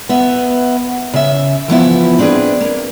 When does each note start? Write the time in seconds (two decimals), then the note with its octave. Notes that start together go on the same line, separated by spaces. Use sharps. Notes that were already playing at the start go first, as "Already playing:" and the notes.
0.09 B3 E5
1.14 C#3 E5
1.68 E3 F3 B3 E4
2.19 C4 D4 G4 G#4 B4
2.60 A#3